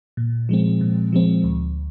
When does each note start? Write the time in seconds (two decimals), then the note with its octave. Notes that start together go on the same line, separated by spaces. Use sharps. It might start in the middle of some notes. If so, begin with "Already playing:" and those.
0.17 A#2
0.49 F3 G#3 C4
0.81 A#2
1.13 F3 G#3 C4
1.44 D2